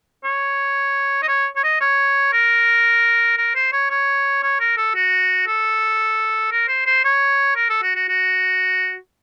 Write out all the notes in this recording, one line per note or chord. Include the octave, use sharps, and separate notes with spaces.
C#5
D#5
C#5
C#5
D#5
C#5
A#4
A#4
C5
C#5
C#5
C#5
A#4
A4
F#4
A4
A#4
C5
C5
C#5
A#4
A4
F#4
F#4
F#4